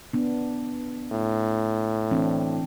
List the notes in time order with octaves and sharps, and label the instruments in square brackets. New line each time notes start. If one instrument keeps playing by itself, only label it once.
[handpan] B3 D4
[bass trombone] A2
[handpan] E3 C4 D4